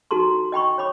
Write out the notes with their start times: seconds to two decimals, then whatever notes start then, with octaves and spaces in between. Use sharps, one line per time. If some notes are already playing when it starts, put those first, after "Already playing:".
0.11 D#4 F#4 A4 A#5 C6
0.52 D#5 G5 B5 C#6
0.78 C#5 B5 D6